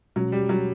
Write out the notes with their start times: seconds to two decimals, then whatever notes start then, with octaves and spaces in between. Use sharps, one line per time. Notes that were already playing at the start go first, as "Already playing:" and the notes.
0.16 B2 F#3 G#3 C#4
0.32 G3
0.49 F#3